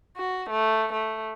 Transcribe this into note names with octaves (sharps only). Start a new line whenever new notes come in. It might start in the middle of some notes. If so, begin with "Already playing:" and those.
F#4
A3
A3